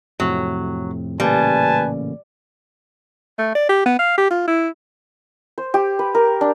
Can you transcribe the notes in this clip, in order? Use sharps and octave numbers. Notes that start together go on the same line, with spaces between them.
F2 A2 C3 F#3
A1 A#2 C#3 G3 B4 G#5 A5
A3
D5
G4
B3
F5
G4
F4
E4
C5
G4
B4
A#4
D4